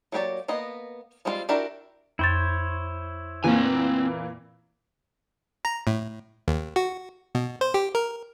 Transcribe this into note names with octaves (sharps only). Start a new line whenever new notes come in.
F#3 A#3 G4 C#5 D5
A#3 B3 D#5
F3 G3 G#3 C4 F4
D4 E4 F#4 G4 A#4
F2 E4 C5 C#5 A6
A#2 E3 A#3 C4 G#5
A#5
A2
D#2
F#4
B2
C5
G4
A#4